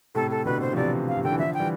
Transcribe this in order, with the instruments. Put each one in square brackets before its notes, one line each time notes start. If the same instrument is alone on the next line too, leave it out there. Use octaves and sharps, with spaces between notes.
[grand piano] A2 C3 [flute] A4
[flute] A4
[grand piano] B2 D3 [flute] B4
[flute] C5
[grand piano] F3
[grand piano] C3 E3 [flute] D5
[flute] F5
[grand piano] C3
[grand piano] D3 [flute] G5
[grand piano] E3
[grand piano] D3 F3 [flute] E5
[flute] G5
[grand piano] E3 G3